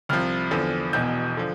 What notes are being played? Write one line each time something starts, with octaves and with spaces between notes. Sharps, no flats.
C2 C3 F3 F6
E2 D3 F3
E1 E2 B2 G6
D3 F3